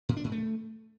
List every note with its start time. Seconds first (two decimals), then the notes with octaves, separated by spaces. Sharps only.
0.09 A2
0.17 D4
0.24 G#2
0.32 A3